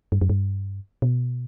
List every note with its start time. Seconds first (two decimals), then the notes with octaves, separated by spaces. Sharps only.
0.12 G2
0.21 F#2
0.29 G2
1.02 B2